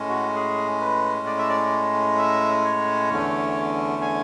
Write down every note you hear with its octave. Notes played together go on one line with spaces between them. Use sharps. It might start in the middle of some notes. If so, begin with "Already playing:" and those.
Already playing: A2 G#3 C#4
F#4
G#4
B4
D5
E5
D5
E5
C#5
E2 D3 A3 C#4
G#5